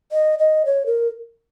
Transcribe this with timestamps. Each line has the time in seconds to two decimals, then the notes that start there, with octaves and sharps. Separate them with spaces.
0.12 D#5
0.39 D#5
0.66 C#5
0.86 A#4